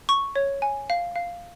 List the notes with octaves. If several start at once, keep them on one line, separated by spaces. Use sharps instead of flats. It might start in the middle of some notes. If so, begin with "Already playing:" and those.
C#6
C#5
G#5
F5
F5